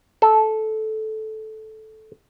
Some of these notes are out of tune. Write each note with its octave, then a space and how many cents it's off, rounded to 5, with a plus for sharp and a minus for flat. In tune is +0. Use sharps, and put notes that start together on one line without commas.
A4 -10